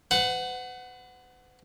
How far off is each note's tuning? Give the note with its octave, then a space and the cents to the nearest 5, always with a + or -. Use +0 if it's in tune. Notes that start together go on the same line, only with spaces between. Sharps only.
B4 +45 F#5 +0